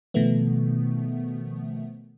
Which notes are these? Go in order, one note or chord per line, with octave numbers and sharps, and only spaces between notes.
B2 D#3 F3 A3 B3